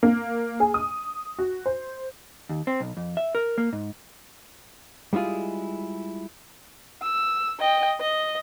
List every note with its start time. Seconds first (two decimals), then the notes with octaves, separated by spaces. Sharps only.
0.03 A#3
0.60 G#4
0.74 D#6
1.38 F#4
1.66 C5
2.49 D#2
2.67 C4
2.80 B1
2.97 F2
3.17 E5
3.35 A#4
3.58 A#3
3.73 G#2
5.13 G3 G#3 E4 F4 G#4
7.02 E6
7.59 D#5 G5
8.00 D#5